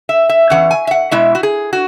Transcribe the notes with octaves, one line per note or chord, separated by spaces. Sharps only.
E5
E5
E2 E3 C#4 F#5
G#5
E5
F#5
B2 G#3 E4 E5
F#4
G#4
F#4